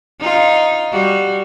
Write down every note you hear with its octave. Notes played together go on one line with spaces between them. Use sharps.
D#4 F4
G3 F#4